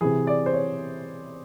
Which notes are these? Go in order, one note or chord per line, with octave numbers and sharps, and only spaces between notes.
C3 E3 G#4
D5
C5
C#5